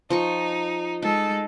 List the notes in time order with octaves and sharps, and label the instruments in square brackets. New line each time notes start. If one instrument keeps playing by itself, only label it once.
[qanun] F3 A#5 C#6 [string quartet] D#4
[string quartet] G#3 A4 [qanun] D#4